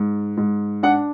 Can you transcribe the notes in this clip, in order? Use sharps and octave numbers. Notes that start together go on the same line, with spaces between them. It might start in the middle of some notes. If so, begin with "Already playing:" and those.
Already playing: G#2
G#2
D4 F#5